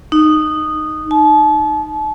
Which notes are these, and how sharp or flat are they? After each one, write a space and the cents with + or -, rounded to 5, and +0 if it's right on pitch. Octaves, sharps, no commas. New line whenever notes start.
D#4 -10
A5 -35